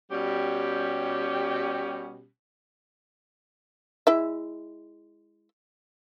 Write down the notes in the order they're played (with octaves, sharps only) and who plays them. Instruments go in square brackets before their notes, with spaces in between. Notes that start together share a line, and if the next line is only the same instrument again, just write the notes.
[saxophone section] B2 G3 C#4 G4
[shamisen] G#3 E4 E5